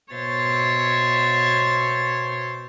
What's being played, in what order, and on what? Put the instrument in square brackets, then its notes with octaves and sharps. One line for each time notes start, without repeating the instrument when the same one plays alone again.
[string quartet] B2 C5 C#5 E5 A6